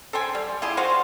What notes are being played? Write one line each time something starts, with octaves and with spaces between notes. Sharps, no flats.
A4 C5 G5 G#5
G3
E4 F4 G4 G#4
F4 F#4 C5 F5